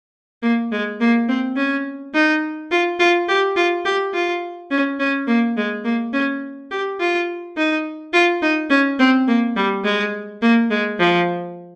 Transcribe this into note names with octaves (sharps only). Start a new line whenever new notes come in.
A#3
G#3
A#3
C4
C#4
D#4
F4
F4
G4
F4
G4
F4
C#4
C#4
A#3
G#3
A#3
C#4
G4
F4
D#4
F4
D#4
C#4
C4
A#3
G3
G#3
A#3
G#3
F3